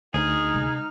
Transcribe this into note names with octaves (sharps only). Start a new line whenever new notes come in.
D2 D#4 G#4 F6
C3 G#3